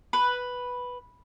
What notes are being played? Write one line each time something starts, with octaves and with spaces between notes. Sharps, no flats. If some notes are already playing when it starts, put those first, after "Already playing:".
B4